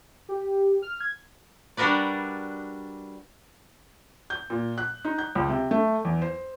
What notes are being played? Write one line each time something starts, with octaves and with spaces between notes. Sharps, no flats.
G4
F6
G#6
G3 D4 F#4 A#4 B4 D5
G6
A#2
F#6
D#4
G6
C#2
C3
A3
E2
C5